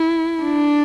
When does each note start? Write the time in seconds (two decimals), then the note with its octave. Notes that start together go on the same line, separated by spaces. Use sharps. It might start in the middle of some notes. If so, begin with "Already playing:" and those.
Already playing: E4
0.43 D4